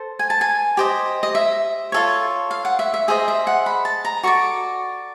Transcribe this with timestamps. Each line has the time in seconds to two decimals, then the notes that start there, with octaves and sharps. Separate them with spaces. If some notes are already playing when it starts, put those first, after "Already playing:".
Already playing: A4 C5
0.19 G#5
0.30 A5
0.41 G#5
0.77 G4 C5 D#5
1.23 D#5
1.35 E5
1.92 F4 A4 C#5
2.51 F5
2.65 F#5
2.79 E5
2.94 E5
3.08 G#4 C5 D#5 E5
3.28 E5
3.47 F#5
3.66 B5
3.85 A5
4.05 A#5
4.23 F#4 A4 D5 C#6